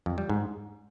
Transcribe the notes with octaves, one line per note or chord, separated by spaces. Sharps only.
F2
G3
G#2